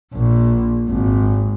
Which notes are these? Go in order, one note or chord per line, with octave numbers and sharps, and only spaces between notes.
A#1
G#1